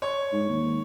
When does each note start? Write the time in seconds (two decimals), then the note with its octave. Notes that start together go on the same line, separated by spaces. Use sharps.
0.02 C#5
0.32 G#2
0.49 D#2